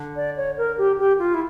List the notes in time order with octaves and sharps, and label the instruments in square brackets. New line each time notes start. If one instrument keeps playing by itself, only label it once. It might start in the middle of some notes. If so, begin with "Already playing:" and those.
Already playing: [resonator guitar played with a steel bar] D3
[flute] D5
C#5
A#4
G4
G4
F4
E4